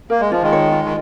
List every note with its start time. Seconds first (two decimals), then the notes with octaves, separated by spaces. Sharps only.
0.10 A#3 A#4
0.20 G#3
0.32 F3 F4
0.42 D#3 G#3
0.53 C#5
0.72 F4
0.85 D#3